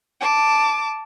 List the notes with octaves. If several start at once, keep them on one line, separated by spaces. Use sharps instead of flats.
A5 D6